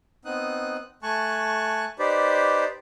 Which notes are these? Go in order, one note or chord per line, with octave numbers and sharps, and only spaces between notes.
B3 C4 D#4 D#6 F#6
A3 G#5 A5 C#6 F#6
D#4 G4 B4 C5 D5